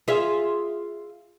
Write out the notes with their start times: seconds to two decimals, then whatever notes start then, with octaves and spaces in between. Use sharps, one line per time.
0.08 F4 G#4 E5